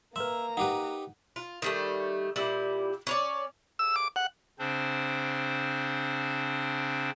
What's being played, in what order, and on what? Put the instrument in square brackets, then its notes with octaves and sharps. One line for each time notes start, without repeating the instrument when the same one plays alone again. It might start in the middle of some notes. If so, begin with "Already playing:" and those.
[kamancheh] A#3 A#5 [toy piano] B4 C6 [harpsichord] E5
[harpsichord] D#4 G4 B4 [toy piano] F#5
[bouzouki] F4
D#3 G3 A3
A#2 G3 E4
C#4 C#5 D5
[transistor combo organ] E6
D6
F#5
[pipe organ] C#3 C4 D4 C5